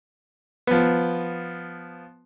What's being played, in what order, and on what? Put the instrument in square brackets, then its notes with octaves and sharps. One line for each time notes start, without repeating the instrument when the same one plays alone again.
[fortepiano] F3 B3